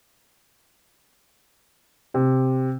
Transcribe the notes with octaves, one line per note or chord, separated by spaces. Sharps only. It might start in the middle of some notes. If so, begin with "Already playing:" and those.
C3